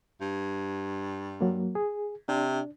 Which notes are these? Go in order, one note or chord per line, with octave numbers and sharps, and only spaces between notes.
G2
F#3 A#3
G#4
C3 D4